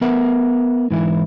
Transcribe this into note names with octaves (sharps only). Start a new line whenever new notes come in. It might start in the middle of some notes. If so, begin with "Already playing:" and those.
B3 A#4 E5 F#5
G#2 E3 E4